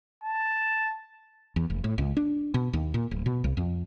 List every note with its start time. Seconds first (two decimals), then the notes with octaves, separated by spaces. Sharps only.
0.24 A5
1.56 E2
1.70 F1
1.84 A2
1.98 C#2
2.17 D4
2.54 B2
2.73 D#2
2.94 A#2
3.11 D1
3.26 B2
3.44 C2
3.57 F2